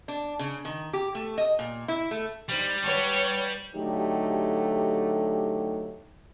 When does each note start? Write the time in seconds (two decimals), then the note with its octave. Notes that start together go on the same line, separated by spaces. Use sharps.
0.08 D4
0.39 C#3
0.65 D#3
0.93 G4
1.15 A3
1.38 D#5
1.59 A#2
1.88 E4
2.11 A3
2.49 G3 D#4 C5 D5
2.83 B4 C#5 F#5 A5
3.75 D3 F#3 A3 D#4 G4